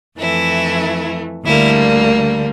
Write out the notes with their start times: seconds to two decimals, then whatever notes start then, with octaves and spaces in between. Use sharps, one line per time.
0.18 F2 E3 A3 E4
1.45 D2 D3 G3 A#3 E4